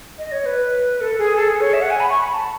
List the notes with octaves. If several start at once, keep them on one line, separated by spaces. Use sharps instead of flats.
D#5
C#5
B4
A4
G#4
A4
G#4
C#5
E5
F#5
G#5
B5
C#6
B5
A5